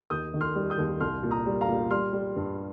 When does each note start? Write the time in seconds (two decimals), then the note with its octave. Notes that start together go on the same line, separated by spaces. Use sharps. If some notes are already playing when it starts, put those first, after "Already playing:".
0.10 D#2 D#6 G6
0.34 D#3
0.41 C6 F6
0.55 G3
0.70 D#6 G6
0.78 D#2
1.00 C2 C6 F6
1.23 A#2
1.31 A#5 D#6
1.46 G3
1.61 F5 A#5
1.68 A#2
1.91 G3 C6 F6
2.13 G3
2.36 G2